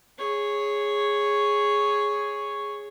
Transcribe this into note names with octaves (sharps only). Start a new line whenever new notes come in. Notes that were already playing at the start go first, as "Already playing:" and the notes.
G#4 C#5